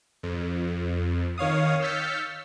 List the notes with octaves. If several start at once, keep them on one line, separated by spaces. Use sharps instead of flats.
F2
D#3 C#5 F5 D#6
E6 F6 G6 A6 B6 C#7